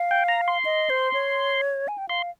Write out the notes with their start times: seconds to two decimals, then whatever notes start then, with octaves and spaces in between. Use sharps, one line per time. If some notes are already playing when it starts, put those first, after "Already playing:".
Already playing: F5
0.11 G5
0.28 A#5
0.48 C6
0.65 D#5
0.90 C5
1.13 C#5
1.88 G#5
1.98 G5
2.09 F5 C6